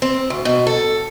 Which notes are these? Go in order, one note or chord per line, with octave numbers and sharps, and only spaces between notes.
C4
D2
B2
A4